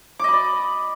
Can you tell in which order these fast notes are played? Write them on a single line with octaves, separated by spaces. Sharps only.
D6 D#5 B5 D5